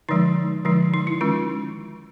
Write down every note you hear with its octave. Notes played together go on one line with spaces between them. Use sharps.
D3 F3 G#3 D#4
D3 F3 G#3 D#4
D#4
E4
D#3 G#3 C#4 F4